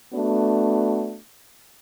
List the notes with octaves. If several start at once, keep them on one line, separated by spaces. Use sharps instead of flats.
A3 B3 D4 F#4